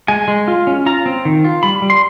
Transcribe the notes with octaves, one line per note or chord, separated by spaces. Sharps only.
G#3 G#5
G#3
F4
C#4
F4 A#5
C4
D#3
F4
G3 B5
G3
C6